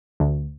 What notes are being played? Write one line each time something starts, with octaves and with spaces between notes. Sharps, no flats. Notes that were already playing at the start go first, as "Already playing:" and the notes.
D2